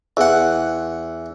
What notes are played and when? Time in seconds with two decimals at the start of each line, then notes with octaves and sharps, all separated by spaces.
0.17 E2 F#5